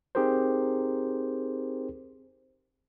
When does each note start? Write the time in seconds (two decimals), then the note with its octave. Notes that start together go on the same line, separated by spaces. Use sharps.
0.15 C4 D#4 G4 G#4 A#4 C5